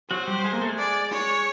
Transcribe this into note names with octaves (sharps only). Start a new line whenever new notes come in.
F#3 F#4 C5
G3 G4
G#3 G#4
A#3 A#4
A3 A4
G#3 G#4
D5
C#5